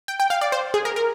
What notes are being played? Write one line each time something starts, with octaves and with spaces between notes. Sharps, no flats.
G5
G5
F5
D5
C5
G#4
A#4
A#4